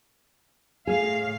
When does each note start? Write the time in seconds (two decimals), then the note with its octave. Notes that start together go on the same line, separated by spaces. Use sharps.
0.87 A2 G#4 F5